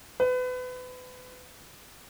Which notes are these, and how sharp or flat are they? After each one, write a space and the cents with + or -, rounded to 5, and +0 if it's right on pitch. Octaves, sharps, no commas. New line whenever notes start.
B4 +30